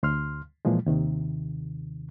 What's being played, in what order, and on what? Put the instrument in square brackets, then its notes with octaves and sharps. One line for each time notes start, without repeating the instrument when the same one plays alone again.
[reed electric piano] D2 C6 F6
A#2 E3 F3 G#3
D#2 C3 D#3